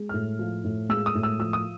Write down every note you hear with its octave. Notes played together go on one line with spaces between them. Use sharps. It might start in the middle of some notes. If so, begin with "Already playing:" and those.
Already playing: G#3
A2 F6
F3
A2
G#3 E6
D#6
A2
E6
F3 E6
D#6